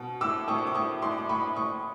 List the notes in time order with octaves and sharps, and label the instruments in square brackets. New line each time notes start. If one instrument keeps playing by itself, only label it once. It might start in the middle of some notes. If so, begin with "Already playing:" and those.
Already playing: [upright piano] B2
A2 D6 E6
A2 C#6 D#6
C#6
D6
A2 C#6 D#6
A2 C6 D6
D6
A2 B5 C#6
A2 C#6 D#6